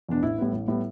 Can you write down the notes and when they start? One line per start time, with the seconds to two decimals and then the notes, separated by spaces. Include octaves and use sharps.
0.09 E2 B2 D4
0.23 A1 E4
0.38 A2 G3 B3
0.53 A1
0.68 A2 G3 B3